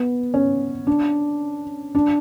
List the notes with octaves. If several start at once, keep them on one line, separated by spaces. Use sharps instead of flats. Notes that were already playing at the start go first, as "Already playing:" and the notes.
Already playing: B3
C#4
D4
D4